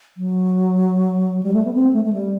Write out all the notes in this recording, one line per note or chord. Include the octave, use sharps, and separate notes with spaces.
F#3
G3
A3
B3
C4
A3
A3
G3